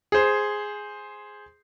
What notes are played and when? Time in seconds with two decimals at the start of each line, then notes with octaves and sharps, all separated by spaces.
0.12 G#4 C5